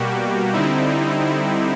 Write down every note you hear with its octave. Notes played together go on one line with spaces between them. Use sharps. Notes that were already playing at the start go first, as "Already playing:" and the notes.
Already playing: B2 G3 A#3 F#4 G4
D3 G3 C4 D#4 E4
D#4
E4